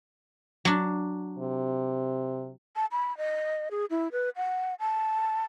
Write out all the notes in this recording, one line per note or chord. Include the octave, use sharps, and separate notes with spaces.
F#3 D4
C3
A5
B5
D#5
G#4
E4
B4
F#5
A5